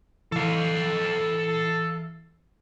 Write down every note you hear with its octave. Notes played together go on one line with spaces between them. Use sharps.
E3 A4 F5